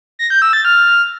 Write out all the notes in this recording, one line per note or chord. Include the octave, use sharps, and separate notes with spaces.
A#6
G6
E6
A6
F6